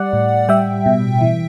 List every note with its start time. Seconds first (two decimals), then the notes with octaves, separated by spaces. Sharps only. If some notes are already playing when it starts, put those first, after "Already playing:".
Already playing: G3 D5 F#5
0.13 A2
0.49 G3 E5 G5
0.86 B2
1.21 E3